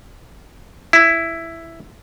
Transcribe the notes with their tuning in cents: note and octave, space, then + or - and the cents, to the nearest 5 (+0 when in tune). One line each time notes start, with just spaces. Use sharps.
E4 +5